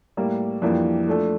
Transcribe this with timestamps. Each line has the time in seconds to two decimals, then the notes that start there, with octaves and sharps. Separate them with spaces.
0.17 A2 G3 A#3
0.62 F2 E3 G3 A#3 D4
1.07 F3 A3 D4 A4